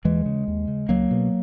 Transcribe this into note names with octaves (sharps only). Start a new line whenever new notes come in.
D#2 E3 G#3
C#3
D#2
C#3
C#2 F#3 A#3
B2